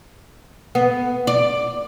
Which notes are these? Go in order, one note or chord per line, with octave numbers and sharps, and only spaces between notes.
B3
D5